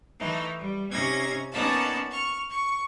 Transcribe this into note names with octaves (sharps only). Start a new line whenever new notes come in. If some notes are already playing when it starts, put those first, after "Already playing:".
E3 A3 D#4
G3
C3 C#4 D#4 G#6 A#6
A#3 B3 C#4 D#4 D5 A5
C#6 F6
C#6